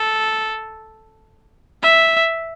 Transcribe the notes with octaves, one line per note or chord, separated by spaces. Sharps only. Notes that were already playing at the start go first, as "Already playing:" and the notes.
Already playing: A4
E5